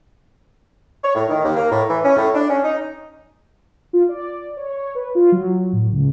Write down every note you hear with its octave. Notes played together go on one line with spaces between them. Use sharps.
C#5
A2
D#3
D#2
A#3
A2
E3
C#4
A2
D4
C#4
D#4
F4
D5
C#5
C#5
B4
F4
F#3
A2
C#2